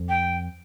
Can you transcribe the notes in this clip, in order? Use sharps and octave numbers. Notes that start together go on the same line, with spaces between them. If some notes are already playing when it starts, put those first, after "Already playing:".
Already playing: F2
G5